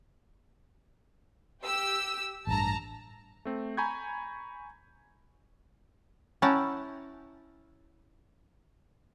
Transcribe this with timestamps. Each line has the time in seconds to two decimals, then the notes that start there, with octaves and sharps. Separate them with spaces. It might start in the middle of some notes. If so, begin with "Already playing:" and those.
1.63 G4 E6
2.47 A1 G2 A5 A#5
3.45 A3 C4
3.77 G#5 A#5 B5 C#6 G6 G#6
6.42 C#4 E4 F#5 G5 A5 A#5